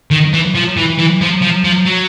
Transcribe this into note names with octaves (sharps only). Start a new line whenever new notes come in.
D#3
E3
F3
E3
E3
F3
F3
F3
F#3